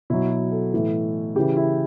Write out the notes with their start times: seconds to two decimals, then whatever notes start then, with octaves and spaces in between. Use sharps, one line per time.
0.10 B2 F#3 E4
0.30 F#4
0.52 A4
0.73 A2 E3
1.35 C#3 E3 G4
1.57 E4